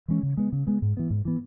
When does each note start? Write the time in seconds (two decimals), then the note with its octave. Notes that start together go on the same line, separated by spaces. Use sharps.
0.08 E3 G#3 C#4
0.23 C#3
0.37 G#3 B3
0.52 C#3
0.67 G#3 B3
0.82 G#2
0.97 E3 B3
1.10 G#2
1.25 E3 B3